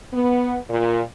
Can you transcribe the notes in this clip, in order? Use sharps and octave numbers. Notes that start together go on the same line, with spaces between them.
B3
A#2